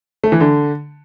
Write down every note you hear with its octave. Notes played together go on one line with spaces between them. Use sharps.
A3
E3
D3